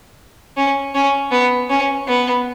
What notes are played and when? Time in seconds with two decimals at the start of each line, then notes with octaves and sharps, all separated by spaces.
0.57 C#4
0.94 C#4
1.31 B3
1.70 C#4
2.07 B3